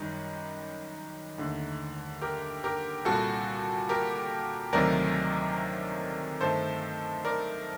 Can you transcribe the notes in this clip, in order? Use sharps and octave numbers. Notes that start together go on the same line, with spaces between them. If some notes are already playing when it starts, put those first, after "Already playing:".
Already playing: F#2 D#3 G3 D#4
D#2 D3 A3
G4 A#4
G4 A#4
C2 A#2 G3 F#4 A4
G4 A#4
D2 C3 D#3 F#3 A3 A#4 D5
G2 D#3 A3 A4 C5
A#4 D5